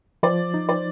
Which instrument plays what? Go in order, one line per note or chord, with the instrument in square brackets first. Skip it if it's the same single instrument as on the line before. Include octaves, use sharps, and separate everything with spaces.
[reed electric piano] F3 [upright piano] C5 D5
[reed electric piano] D#4
[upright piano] C5 D5